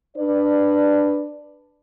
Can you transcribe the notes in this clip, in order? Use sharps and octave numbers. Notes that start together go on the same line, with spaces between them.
D4 B4 D5